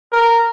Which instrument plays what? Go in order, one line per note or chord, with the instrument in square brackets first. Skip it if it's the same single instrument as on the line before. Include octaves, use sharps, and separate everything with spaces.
[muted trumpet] A#4